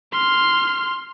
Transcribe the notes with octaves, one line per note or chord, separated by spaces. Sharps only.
C6 F6